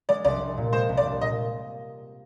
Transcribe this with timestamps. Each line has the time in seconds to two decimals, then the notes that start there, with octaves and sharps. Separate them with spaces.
0.09 G#3 D5
0.25 C2 D5
0.41 C2
0.57 A#2
0.72 G#3 C5
0.89 C2
0.97 D5
1.06 C2
1.21 A#2 D#5